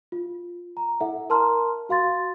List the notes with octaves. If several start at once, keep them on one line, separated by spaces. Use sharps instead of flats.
F4
A#5
E4 A4 E5 F#5
A#4 A5 A#5 C6 F6
F#4 F5 C6 A6